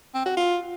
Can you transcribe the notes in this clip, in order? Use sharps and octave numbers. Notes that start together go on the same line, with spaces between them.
C4
F#4
F4